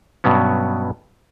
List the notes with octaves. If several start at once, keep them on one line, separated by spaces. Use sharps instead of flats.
G2 B2 F#3 B3 C#4